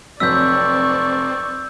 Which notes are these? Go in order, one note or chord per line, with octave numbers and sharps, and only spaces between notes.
F1 F#3 C4 D5 C#6 E6 G6 B6